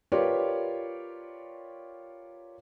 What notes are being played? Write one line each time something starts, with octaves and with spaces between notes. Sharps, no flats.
F4 G4 A#4 B4 C#5 D5